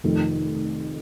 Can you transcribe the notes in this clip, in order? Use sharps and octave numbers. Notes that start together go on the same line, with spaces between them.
F1 F2 D#3 A3 D#4